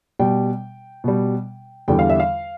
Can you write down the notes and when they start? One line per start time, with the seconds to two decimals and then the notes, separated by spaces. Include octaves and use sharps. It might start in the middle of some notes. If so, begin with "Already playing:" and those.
0.19 B2 G3 G5
1.04 B2 G3
1.88 E2 D3 G3 G5
1.99 F5
2.10 E5
2.20 F5